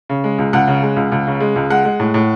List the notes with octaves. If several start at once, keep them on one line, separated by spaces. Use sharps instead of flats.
C#3
G#3
C#2
C#2 F#5
C#3
G#3
C#2
C#2
C#3
G#3
C#2
G#3 F#5
G#3
A2
A2